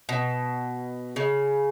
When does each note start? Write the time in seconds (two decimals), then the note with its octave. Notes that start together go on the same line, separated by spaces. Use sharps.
0.09 B2
1.16 C#3